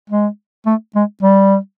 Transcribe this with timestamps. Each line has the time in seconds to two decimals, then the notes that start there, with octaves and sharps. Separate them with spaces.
0.10 G#3
0.66 A3
0.95 G#3
1.23 G3